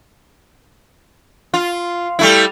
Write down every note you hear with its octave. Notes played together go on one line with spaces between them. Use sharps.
F4
G3 A3 E4